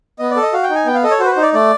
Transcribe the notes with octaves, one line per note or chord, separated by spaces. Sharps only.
B3 D#5
D5
A4
D#5
F#4 F5
G5
D#4
G#5
B3 G5
F5
A4 D#5
C#5
F#4 C5
B4
C5
D#4
D5
A3 D5